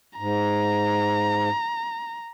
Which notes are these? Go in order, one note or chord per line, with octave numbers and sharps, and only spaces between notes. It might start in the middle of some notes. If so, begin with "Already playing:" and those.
G#2 A#5